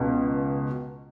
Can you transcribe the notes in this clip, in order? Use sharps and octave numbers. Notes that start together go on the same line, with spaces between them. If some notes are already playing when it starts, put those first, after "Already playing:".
Already playing: C#2 B2